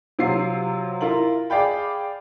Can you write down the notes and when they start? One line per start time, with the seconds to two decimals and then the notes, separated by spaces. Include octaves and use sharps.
0.19 C3 F#3 F4 C7
1.01 E4 F4 A#4 F#7
1.50 G#4 D5 F5 G5 B5